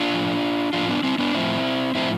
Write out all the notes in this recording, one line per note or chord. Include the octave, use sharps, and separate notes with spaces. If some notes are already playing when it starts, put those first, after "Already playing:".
Already playing: D4 F4
A2 F3
A2 F3 D4 F4
B3 D4
C4 E4
B3 D4
A2 F3 C4 E4
A2 F3 C4 E4